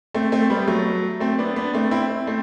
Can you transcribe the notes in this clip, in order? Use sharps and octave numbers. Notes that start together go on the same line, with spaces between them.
A3 C4
A3 C4
G3 B3
F#3 A3
A3 C4
B3 D4
B3 D4
A3 C4
C4 E4
A3 C4